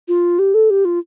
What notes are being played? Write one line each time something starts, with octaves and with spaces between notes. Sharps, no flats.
F4
G4
A4
G4
F4